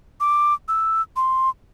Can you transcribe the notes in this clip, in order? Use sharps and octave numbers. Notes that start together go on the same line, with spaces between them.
D6
E6
C6